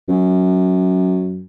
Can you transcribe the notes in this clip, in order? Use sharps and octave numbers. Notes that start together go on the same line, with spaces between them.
F#2